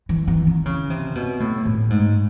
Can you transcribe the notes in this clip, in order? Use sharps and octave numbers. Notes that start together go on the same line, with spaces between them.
E3
E3
D#3
C#3
C3
B2
A2
A2
G#2